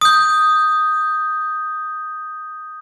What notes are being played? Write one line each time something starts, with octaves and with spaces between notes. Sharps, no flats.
D#6 G6